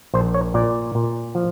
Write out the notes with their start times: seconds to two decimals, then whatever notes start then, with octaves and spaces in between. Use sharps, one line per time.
0.14 A#1 C5
0.34 C#5
0.54 A#2 D5
0.95 A#2
1.35 F3